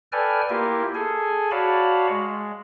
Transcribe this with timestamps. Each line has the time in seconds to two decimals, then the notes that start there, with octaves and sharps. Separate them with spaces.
0.12 A4 B4 D5 G5 G#5 F6
0.50 A#3 E4 F4 G4 A#4
0.95 G#4 A4 G#5
1.51 F#4 C#5 D5 F5 A5 B5
2.09 G#3